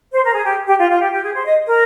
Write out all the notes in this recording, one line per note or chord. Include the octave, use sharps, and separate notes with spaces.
C5
A#4
G#4
G4
G4
F4
F4
G4
G4
G#4
C5
D#5
A#4